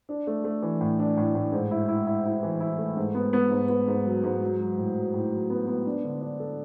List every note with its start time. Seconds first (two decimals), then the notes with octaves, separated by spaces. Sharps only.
0.09 D4
0.27 A3
0.44 A3
0.62 E3
0.80 A2
0.99 D4
1.17 A2
1.35 A2
1.52 G#2
1.71 E4
1.88 E4
2.07 E4
2.25 E4
2.43 E3
2.60 E4
2.78 A3
2.96 G#2
3.14 B3
3.33 B3
3.51 G#2
3.69 B3
3.87 G#2
4.06 F#3
4.23 G#2
4.42 F#3
4.59 F#3
4.78 A2
4.95 F#3
5.14 A2
5.31 F#3
5.50 B3
5.67 B3
5.86 D4
6.04 D3
6.21 D4
6.40 A4